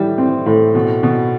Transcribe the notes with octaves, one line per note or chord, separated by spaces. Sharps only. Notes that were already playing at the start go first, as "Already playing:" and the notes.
Already playing: A2 E3 G3
C4
A2
B2
B2